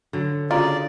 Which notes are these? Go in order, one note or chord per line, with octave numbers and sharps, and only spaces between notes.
D3 F#3
C#3 F4 F#4 D5 A#5